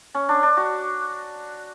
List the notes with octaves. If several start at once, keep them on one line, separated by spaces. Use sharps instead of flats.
C#4
D4
D4
F#4